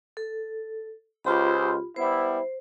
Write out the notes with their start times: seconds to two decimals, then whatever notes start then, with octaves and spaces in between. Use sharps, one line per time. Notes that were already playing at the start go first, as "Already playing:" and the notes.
0.17 A4
1.24 C#2 F4 G4 C5 B5
1.96 G3 B3 E4 C5